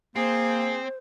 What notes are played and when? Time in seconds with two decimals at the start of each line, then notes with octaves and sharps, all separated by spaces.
0.16 A#3 C4 G#4 C5